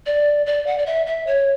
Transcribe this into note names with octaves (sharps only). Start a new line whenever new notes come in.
D5
D5
F#5
D5
E5
E5
C#5